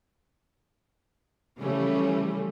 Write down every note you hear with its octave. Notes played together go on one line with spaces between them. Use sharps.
C#3 E3 F3 G3 A3 C#4